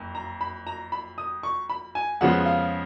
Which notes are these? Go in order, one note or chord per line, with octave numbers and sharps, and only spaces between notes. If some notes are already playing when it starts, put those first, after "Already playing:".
Already playing: F#1 F2
A#5
B5
A#5
B5
D#6
C#6
B5
G#5
F2 C#3 F3 G#3 B3 F#5
F5